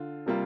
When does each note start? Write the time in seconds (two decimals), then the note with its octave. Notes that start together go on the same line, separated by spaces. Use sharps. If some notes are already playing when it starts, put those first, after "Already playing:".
Already playing: D3 F4
0.26 C3 G3 A#3 F4